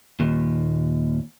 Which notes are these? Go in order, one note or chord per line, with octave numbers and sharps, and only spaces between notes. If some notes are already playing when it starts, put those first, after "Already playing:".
D#2 A#2